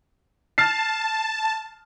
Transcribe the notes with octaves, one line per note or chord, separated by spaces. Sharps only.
A5 F6 A6 C7